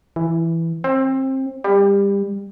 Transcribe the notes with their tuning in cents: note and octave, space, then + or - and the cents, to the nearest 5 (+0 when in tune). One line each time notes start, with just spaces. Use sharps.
E3 +5
C4 +25
G3 +25